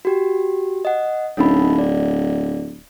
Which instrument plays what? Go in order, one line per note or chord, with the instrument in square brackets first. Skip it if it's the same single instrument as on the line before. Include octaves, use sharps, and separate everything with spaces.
[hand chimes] F#4 G4
D#5 F#5
[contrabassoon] D1 [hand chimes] C#4 D#4 B5
[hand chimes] D5